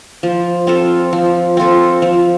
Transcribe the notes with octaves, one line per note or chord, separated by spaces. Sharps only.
F3
C4 F4 A4
F3
C4 F4 A4
F3